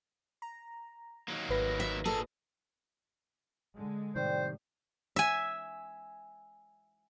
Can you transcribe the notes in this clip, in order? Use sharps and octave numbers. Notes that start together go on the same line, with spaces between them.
A#5
D#3 F#3 A#3
G#1 B4 A#6
E5
A#2 G#4 A4 D#5
D3 G#3
A2 C3 D#3 G3 C5 D5 G5
E5 G#5